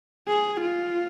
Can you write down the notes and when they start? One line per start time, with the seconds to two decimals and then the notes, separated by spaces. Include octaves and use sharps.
0.28 G#4
0.61 F4